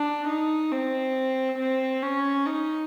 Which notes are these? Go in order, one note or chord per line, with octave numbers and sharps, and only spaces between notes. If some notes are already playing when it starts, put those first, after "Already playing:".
Already playing: D4
D#4
C4
C4
C#4
D#4